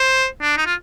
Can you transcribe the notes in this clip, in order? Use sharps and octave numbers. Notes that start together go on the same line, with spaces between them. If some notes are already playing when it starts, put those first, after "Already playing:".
Already playing: C5
D4
D#4
F4